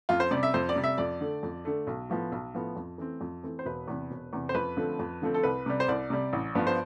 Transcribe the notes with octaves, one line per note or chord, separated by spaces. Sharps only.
F2 F4
C5
C3 G3 D5
E5
F2 C5
D5
C3 G3
E5
F2 D5
D3 A3
F2
D3 A3
B1
A2 F3 B3
B1
A2 F3 B3
F2
E3 A3 C4
F2
E3 A3 C4
C5
E1 B4
E2 C3
E1
E2 C3
C5
F2 B4
D3 F3 A3 C4
F2
D3 F3 A3 C4
A4
C2 B4
C3 G3
C5
C2 D5
C3 G3
A1
G2 F3 B3
C5